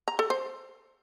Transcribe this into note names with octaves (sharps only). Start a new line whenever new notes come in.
A#5
A4
C5